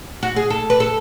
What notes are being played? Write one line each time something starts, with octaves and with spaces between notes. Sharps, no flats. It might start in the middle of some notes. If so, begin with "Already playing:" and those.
F#4
G#4
A4
B4
A4